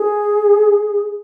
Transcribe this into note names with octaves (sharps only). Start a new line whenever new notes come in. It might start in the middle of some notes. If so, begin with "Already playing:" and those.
Already playing: G#4